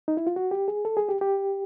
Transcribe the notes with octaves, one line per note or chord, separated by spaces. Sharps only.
D#4
E4
F4
F#4
G4
G#4
A4
G#4
G4
G4